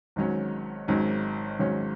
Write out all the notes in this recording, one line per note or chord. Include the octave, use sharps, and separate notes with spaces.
G#1 G#2 D#3 F#3 C#4
G#1 G#2 D#3 F#3 C#4
G#1 G#2 D#3 F#3 C#4